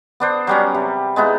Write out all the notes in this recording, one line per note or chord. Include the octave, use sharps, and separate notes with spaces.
B3 D4 C5
F#3 G3 C#4
C3
G#3 B3 D#4 E4